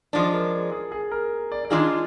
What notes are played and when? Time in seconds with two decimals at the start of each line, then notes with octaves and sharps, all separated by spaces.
0.13 F3 G#3 D4 D5
0.33 A#4
0.52 G#4
0.72 G#4
0.92 G#4
1.11 A#4
1.52 D5
1.65 D5
1.70 D#3 G#3 D4 F4 G#4 D#5